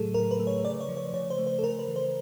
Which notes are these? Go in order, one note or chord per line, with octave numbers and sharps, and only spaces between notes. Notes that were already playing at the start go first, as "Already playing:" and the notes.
Already playing: A2 C#3 F#3 A3 G#4 A4
A2 A#4
B4
A3
C#5
C#3 D5
C#5
F3
C#5
C#3 C#5
C5
A3
C5
A4
C#3 A#4
B4
E3
C5